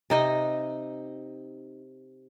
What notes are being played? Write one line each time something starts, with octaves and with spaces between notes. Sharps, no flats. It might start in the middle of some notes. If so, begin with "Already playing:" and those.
C3 D#4 D#5